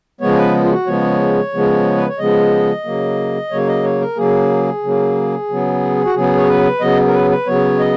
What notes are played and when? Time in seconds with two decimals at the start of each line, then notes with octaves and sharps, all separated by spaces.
0.21 C#3 F3 G#3 B3 C#5
0.37 B4
0.64 F4
0.71 F#4
0.87 C#3 F3 G#3 B3 C#5
1.53 C#3 F3 G#3 B3
1.97 B4
2.08 C#5
2.19 C#3 F3 G#3 B3 D#5
2.85 C#3 F#3 A#3
3.51 C#3 F#3 A#3 C#5
3.68 D#5
3.84 C#5
4.00 A#4
4.17 C#3 F#3 A#3 G#4
4.83 C#3 F#3 A#3
5.49 C#3 F#3 B3
6.05 F#4
6.15 C#3 F#3 B3 G#4
6.37 C#5
6.48 B4
6.81 C#3 F#3 B3 D#5
7.07 A#4
7.13 B4
7.30 B4
7.47 C#3 F#3 B3 C#5
7.79 D#5